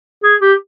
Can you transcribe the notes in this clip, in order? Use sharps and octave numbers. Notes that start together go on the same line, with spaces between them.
G#4
G4